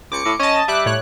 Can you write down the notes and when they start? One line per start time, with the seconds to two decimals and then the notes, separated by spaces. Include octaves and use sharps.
0.12 C#2 D6 C#7
0.25 A2
0.39 C#4 D#5 A5
0.68 G3 E5 D6 F#6
0.86 A2 C#5 F#6